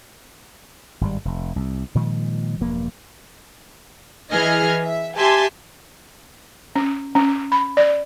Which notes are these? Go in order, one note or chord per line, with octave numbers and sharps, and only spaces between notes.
G#1 G2 G3
F1
C2
A#2 D#3 F3 G#3
E1 G2 F3 A#3
E3 G#4 D#5 F6 G#6
E5
G4 E5 G#5 A5 C6
C#4
C#4
B5
D5